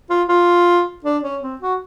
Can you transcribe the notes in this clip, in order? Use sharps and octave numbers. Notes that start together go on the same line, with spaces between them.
F4
F4
D4
C#4
C4
F#4